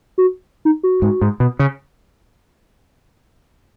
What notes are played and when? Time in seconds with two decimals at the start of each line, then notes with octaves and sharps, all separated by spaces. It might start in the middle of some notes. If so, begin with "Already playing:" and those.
0.18 F#4
0.65 D#4
0.83 F#4
1.02 G#2
1.21 G#2
1.40 B2
1.59 C#3